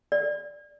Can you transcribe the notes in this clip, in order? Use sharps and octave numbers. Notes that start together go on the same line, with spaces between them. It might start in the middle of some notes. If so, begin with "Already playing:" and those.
D5